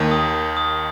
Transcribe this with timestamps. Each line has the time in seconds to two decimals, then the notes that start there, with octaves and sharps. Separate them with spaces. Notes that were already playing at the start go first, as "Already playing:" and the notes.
Already playing: D#2 D#3
0.11 D#6
0.35 D#6
0.57 D#6